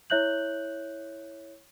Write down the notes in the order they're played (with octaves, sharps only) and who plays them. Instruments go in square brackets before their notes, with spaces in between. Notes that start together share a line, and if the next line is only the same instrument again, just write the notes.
[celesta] E4 C#5 E5 F#6 G6 F#7